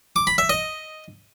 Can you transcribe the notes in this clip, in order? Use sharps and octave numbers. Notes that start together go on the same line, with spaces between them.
D6
B5
E5
D#5